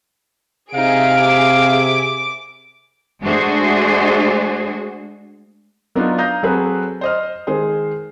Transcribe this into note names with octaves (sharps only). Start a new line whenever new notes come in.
C3 D#4 G#4 E5 F5 D7
D6
G#3 A3 D4 F#4 G#4 C5
F#3 B3 D4 D#4 F4
F5 A#5 D#6 G6 A#6
F#3 C4 G#4 A4 B4
C5 D#5 F6
D#3 G#3 G#4 C5